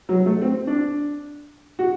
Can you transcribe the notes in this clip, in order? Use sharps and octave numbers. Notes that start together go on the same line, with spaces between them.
F#3
A3
C4
D4
F#4